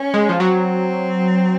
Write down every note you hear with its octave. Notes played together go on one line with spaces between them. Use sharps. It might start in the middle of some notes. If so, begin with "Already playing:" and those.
Already playing: C#4
G#3
F3
F#3 C4